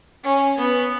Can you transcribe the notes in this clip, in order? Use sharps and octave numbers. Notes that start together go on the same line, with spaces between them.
C#4
B3